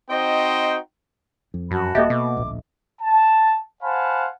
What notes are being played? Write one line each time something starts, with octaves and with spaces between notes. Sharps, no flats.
C4 D#4 F#4 C5 D#5 G5
F2
F#2 F#4 A5 B5
D#1 A#3 G4 A4 D#5 E5
B2 A#3 D6
D1 A#1
A5
C5 F5 F#5 G#5 A5 B5